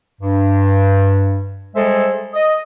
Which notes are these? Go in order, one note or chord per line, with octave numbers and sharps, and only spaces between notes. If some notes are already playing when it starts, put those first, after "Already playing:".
G2
G3 G#3 G#4 A4 C5 E5
D#5